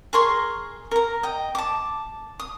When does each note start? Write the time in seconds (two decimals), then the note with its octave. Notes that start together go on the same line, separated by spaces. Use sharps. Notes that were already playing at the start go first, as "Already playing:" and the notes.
0.13 G#4 A#4 C6 C#6
0.91 A#4 A#5
1.23 D#5 G5
1.55 A5 D6
2.40 D#6